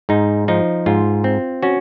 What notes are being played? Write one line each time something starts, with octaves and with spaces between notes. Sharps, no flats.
G#2 D#4
F3 D#4
G#2 F4
C4
C#4 F#4